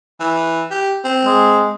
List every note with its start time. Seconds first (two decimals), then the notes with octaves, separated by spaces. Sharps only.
0.20 E3
0.71 G4
1.04 C4
1.25 G#3